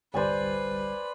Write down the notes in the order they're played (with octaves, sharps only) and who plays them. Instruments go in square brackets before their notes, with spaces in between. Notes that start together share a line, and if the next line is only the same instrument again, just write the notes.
[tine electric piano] G1 C2 G3 [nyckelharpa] B4 B5 [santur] C5 D5 G#5